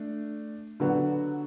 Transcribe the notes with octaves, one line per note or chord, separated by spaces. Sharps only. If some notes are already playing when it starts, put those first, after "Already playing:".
Already playing: A3 D4
D3 F#3 B3 F#4